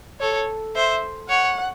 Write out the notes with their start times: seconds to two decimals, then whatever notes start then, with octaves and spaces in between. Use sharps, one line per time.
0.20 A4 C#5
0.75 C5 E5
1.29 C#5 F#5